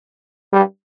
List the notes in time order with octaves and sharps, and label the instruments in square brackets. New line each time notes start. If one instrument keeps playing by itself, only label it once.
[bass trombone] G3